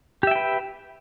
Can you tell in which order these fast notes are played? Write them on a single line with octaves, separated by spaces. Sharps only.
G4 E5 G5 B4